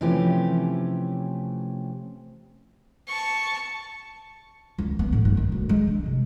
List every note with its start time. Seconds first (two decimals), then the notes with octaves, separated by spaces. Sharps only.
0.01 C3 E3 F3 A3 C#4 G4
3.08 A5 C#6
4.78 C#2
4.99 B3
5.13 A2
5.25 G2
5.37 D#3
5.52 D1
5.69 G#3
5.87 D4
6.06 C3